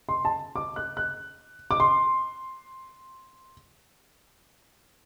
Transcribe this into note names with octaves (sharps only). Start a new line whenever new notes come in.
C6
A5
D6
F#6
F#6
D6
C6